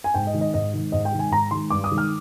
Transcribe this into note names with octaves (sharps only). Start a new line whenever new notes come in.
G#5
G#2 G5
D#5
D#3 G#3
D#5
G#2 D#5
D#3 G#3
G#2 D#5
G5
D#3 G#3
G#5
G#2 A#5
D#3 G#3 C6
G2 D6
D#6
D#3 G#3
F6